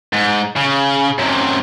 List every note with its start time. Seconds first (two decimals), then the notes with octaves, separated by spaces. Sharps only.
0.13 G#2
0.56 C#3
1.18 F#2 C3